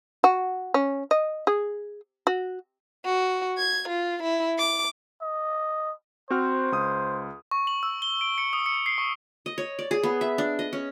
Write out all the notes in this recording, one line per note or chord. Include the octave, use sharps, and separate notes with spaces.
F#4
C#4
D#5
G#4
F#4
F#4
G#6
F4
E4
D6
D#5
C4 F#4 C5 F6
C#2 D#6
C#6
F#7
E6
G7
D7
C#7
D#6
C#7
C7
C#6
D#5
C#5
D5
G#4
B3
E5
D4
D#5
C#4